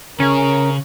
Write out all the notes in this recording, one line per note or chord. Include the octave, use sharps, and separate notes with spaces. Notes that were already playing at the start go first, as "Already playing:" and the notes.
C#3 C#4 G#4 A#4